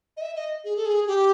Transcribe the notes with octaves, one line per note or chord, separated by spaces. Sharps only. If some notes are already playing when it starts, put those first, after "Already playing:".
D#5
E5
D#5
G#4
A4
G#4
G4